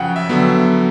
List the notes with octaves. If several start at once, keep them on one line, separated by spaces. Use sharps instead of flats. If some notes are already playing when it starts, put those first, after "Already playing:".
Already playing: F#2 C#3 F3 F#5 G5
E5
D3 F#3 B3